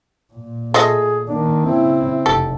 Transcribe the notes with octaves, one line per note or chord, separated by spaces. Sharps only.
A#2
A3 F4 G#4 D#5
D#3 A#3 D4
C#3 C4 E4
F1 G4 A4